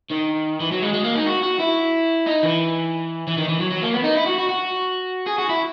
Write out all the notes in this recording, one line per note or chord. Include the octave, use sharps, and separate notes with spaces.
D#3
E3
F#3
G#3
G#3
A#3
D#4
F#4
F#4
E4
D#4
E3
E3
D#3
E3
F#3
F#3
A#3
B3
D#4
E4
F#4
F#4
F#4
G#4
F#4
E4